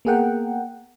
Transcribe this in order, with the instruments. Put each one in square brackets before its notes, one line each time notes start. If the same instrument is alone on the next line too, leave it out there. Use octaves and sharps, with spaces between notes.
[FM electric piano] A#3 B3 G#4 A#4 F#5 G5